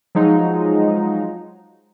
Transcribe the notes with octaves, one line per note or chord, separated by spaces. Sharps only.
F3 F#3 G#3 D#4